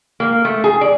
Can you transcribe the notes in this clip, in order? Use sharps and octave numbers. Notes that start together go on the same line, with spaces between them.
A#3
A3
G#4
D5